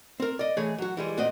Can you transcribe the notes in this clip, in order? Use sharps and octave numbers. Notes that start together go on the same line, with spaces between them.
C4 A#4
D5 D#5
E3 A3 G#4 C#5
F#3 F#4
E3 G3 G#3
A#2 C4 F#4 D5 D#5